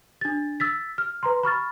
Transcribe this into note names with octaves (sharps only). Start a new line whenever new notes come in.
D4 A6
E6 A6 B6
F6
B4 A#5 C6
B5 C#6 F6 A6